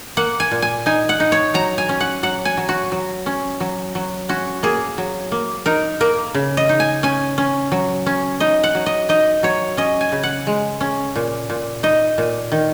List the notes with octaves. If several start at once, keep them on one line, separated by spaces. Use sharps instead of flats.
A#3 F#5
G#5
A#2
G#5
D#4 G#5
F#5
D#4
C#5
F#3 A#5
G#5
C#4
F#5
F#3 F#5
G#5
F#3
F#4
F#3
C#4
F#3
F#3
C#4 F#4
A#3 G#4
F#3
A#3
D#4 A#4
A#3 A#4
C#3
D#5
D#4
G#5
C#4 G#5
C#4
F#3
C#4
D#4 D#5
F#5
F#3
D#5
D#4 D#5
F#3 C#5
C#4 D#5
G#5
C#3
F#5
G#3
C#4
A#2
A#2
D#4 D#5
A#2
D#3